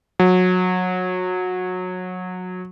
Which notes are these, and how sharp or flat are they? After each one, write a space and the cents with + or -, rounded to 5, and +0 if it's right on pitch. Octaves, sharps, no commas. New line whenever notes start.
F#3 -20